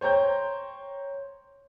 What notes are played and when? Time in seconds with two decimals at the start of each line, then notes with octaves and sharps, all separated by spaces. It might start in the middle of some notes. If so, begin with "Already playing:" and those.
0.01 C5 C#5 G5 A#5 G6